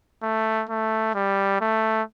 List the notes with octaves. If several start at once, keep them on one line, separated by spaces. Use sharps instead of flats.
A3
A3
G3
A3